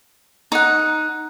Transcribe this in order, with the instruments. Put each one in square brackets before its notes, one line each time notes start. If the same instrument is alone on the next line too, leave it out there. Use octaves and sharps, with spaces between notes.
[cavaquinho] D#4 F#5